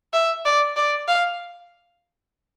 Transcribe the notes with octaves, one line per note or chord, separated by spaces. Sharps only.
E5
D5
D5
F5